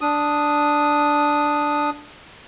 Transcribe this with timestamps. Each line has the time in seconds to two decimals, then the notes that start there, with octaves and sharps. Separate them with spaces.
0.01 D4 D#6